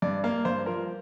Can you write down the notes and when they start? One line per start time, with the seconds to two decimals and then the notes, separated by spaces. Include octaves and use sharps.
0.02 G2 D5
0.24 A#3 F5
0.45 G2 C5
0.66 F3 A#4